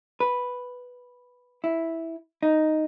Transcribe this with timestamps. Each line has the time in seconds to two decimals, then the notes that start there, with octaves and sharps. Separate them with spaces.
0.20 B4
1.64 E4
2.43 D#4